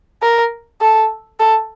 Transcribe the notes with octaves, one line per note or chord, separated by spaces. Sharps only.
A#4
A4
A4